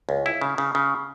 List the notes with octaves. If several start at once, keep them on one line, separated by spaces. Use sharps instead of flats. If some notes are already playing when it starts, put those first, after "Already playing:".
C#2
E4
C#3
C#3
C#3